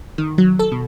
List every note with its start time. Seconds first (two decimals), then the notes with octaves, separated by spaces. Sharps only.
0.18 D#3
0.38 F#3
0.59 A4
0.72 B2